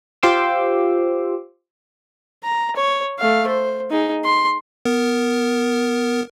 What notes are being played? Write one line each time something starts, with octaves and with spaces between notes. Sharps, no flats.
F4 G4 C5 C6 D6 E6
A#5
C#5
A3 F5
C5
D#4 G#4
C6
B3 A#4